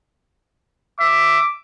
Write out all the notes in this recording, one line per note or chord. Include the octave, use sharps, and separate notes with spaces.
E5 D6